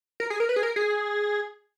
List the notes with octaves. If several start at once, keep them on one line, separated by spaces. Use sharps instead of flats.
A#4
G#4
A#4
B4
G#4
A#4
G#4